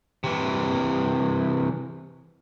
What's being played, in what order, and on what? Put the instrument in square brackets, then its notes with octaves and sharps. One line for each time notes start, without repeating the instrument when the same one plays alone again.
[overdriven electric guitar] C3 E3